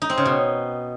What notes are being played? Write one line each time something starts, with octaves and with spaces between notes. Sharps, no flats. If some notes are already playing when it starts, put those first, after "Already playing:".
D#4
C4
C#3
B2